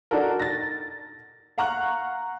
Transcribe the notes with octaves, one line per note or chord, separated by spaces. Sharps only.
D4 D#4 F#4 A4 A#4
A6 A#6
F5 F#5 A#5 C#6 F6 F#6